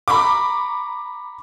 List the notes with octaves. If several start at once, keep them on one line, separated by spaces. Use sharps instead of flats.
A#5 B5 C#6 D6